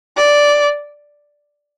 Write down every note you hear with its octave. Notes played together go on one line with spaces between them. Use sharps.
D5